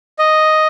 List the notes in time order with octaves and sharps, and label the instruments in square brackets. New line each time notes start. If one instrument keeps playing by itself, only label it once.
[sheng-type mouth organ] D#5